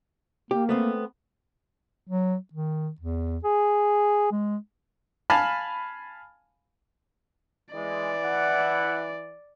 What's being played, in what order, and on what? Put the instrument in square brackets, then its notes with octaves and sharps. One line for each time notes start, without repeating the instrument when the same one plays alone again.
[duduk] A#3 [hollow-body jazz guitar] G4
[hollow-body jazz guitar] A3 B3 C4
[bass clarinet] F#3
D#3
E2
G#4
G#3
[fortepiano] F5 G#5 A5 B5 F6
[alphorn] E3 [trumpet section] G#3 [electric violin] D5
[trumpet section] E4 F#5